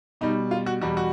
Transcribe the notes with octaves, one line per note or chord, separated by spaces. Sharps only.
B2 G3 D#4
F4
F#4
E2 B2 G3 F#4
F#4